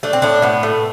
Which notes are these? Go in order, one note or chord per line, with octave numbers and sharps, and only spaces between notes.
A3 D4
C4
A2 D4
A2 B3
A3